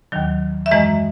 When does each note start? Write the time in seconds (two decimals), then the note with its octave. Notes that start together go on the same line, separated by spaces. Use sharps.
0.12 D#2 D#3 F#3
0.66 E5
0.71 F#2 E3 G#3 D#5